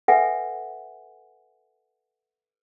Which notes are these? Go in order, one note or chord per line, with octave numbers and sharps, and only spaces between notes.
A4 B4 E5 F#5 G#5